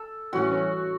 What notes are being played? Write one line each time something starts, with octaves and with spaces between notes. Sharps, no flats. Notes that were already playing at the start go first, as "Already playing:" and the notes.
Already playing: A4
A2 E3 G3 C#4 F#4